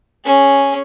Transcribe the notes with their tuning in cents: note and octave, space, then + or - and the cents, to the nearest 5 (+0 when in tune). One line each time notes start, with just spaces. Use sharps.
C#4 +0 G#4 +0